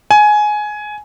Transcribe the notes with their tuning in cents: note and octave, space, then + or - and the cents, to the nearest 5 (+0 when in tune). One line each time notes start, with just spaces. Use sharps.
G#5 +15